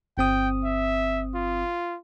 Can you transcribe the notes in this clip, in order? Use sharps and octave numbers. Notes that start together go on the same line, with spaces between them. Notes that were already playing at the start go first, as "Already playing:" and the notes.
G1 C4 G5 D#6
E5
F4